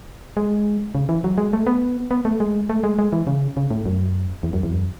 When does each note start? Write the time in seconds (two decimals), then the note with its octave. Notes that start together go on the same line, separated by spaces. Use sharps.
0.37 G#3
0.95 C#3
1.09 E3
1.24 F#3
1.38 G#3
1.53 A3
1.67 B3
2.11 B3
2.25 A3
2.40 G#3
2.69 A3
2.84 G#3
2.99 G#3
3.13 E3
3.27 C#3
3.57 C#3
3.71 A2
3.86 F#2
4.43 E2
4.53 F#2
4.63 E2
4.73 F#2